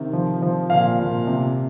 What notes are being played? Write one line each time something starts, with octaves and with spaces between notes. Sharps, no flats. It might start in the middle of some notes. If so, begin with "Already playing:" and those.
Already playing: C3 D#3
F3
F3
A#2 F5
A#2
C3